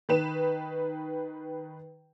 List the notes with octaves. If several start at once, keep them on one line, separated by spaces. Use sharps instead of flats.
D#3 B4 E7